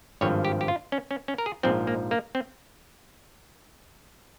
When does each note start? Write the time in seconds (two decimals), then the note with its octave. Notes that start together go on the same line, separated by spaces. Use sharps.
0.21 G#1 G2 F3 C#5
0.45 G4
0.61 G4
0.68 F4
0.92 C#4
1.11 C#4
1.28 C#4
1.38 A#4
1.46 G#4
1.63 A#1 G#2 F3 C4
1.87 A#3
2.11 A#3
2.35 C4